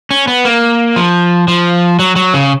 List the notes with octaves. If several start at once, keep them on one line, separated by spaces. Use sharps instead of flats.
C#4
B3
A#3
F3
F3
F#3
F#3
C#3